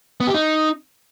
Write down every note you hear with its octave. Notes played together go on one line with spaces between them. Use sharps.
B3
G4
D#4